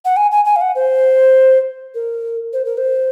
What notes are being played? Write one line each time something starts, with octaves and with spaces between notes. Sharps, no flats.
F#5
G#5
G#5
G#5
F5
F#5
C5
A#4
C5
A#4
C5